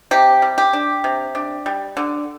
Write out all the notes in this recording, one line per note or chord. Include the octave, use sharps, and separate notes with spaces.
C3 G4
G3
G4
D4
C3
D4
G3
D3